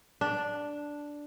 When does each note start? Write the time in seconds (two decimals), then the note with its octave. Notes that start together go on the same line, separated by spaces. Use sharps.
0.21 D4